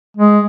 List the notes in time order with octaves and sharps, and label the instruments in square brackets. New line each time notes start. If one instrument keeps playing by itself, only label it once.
[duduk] G#3